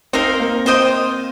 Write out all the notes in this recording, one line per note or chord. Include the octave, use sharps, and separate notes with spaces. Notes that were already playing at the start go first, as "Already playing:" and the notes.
C4 D#4 A#4 F5
A#3
C4 F4 C5 D#5 G5